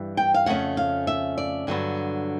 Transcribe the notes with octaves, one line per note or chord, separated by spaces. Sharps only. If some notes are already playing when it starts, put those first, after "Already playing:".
Already playing: G2 E3 G3
G5
F5
F2 C#3 A3 C#4 F#5
F5
E5
D5
G2 D3 F#3 B3